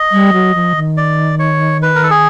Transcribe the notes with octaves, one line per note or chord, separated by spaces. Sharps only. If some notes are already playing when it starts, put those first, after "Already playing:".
Already playing: D#5
G3
F#3
F3
D#3
D5
C#5
B4
A#4
A4
G#4